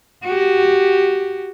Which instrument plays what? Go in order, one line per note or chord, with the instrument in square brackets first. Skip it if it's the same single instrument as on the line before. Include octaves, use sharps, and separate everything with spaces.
[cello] F#4 G4